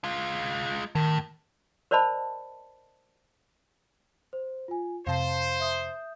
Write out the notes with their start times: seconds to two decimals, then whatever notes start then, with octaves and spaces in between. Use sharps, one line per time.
0.04 G#3 F4
0.95 A2 D#3
1.91 A#4 C5 D5 D#5 A5 B5
4.33 C5
4.68 F4 G#5
5.07 F2 C3 C5 F5 A5
5.60 E5 D#6 G6